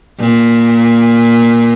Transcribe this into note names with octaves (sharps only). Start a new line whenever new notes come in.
A#2